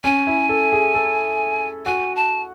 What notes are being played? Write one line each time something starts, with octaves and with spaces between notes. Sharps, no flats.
C#4 G#5
E4
A4
G#4
A4
F#4 G#5
A5